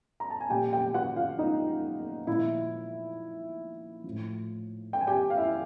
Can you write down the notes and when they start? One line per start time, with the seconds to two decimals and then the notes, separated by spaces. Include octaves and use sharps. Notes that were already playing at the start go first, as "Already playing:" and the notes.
0.20 A#5
0.30 A5
0.40 G#5
0.50 A#2 F3 G4 G5
0.73 G4 G5
0.91 G5
0.94 F#4 F#5
1.16 F4 F5
1.39 D#4 D#5
2.27 A#2 F3 E4 E5
4.04 A2 F3
4.93 G5
5.01 G#5
5.07 G4 G5
5.30 F5
5.37 E4 E5